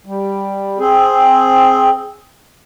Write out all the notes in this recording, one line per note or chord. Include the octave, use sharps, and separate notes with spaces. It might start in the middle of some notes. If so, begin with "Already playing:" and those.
G3
C4 G#4